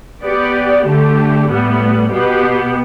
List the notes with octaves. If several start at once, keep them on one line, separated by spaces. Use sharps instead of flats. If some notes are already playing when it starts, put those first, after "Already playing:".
B3 G4 D5
D3 A3 G4
A2 G3 B3
B2 B3 G4